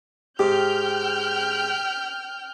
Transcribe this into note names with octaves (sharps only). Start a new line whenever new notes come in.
G#2 G4 G5 F6 G6